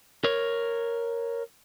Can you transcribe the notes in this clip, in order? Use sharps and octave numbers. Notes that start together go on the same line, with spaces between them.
A#4 C#5